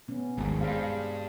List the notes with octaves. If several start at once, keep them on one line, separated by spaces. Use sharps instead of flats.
B2 B3 C#4
G#1 D#2 G#3
G2 G#4 C5 F5